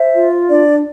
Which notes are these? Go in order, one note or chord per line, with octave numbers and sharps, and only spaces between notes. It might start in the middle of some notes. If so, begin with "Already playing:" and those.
Already playing: C5 E5
F4
D4 D5